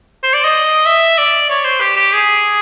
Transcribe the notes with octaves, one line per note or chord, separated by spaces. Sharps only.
C5
D5
D#5
E5
D5
C#5
C5
G4
G4
G#4